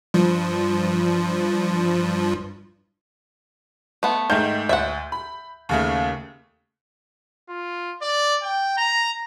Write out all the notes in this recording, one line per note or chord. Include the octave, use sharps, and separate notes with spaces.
G2 F3
A3 B3
G#2 D#3 A3 G6
D2 E5 F#5
B5
D#2 C#3 A3
F4
D5
G5
A#5